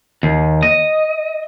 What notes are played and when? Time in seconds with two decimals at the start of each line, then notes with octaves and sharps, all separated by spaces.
0.23 D#2
0.63 D#5